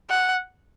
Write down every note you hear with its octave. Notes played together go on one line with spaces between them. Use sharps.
F#5